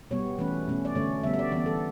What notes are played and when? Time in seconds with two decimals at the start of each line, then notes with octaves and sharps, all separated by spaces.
0.11 B2 G3 B3 C#5
0.38 E3 A3 C#4 B4
0.68 B2 A3 C#4
0.85 D5
0.95 D3 A3 C#4 C#5
1.23 D3 G3 B3 E5
1.34 E5
1.39 D5
1.52 E3 B3 D5
1.66 A4